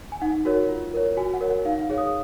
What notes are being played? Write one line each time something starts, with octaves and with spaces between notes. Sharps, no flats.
G#5
D#4 F#5
F#4 A#4 C#5
F4
A#4 C#5
F#4 G#5
F#5
A#4 C#5
F#5
D#4 F5
F5
G#4 C#5
D#6